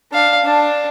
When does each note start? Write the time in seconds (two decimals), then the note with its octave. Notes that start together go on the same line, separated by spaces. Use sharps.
0.12 D4 F5
0.45 D4 A5